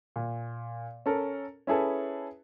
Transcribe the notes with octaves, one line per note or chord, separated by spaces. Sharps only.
A#2
C#4 A4 A#4
C#4 E4 G#4 A4 B4